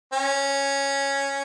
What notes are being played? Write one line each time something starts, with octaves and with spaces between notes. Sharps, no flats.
C#4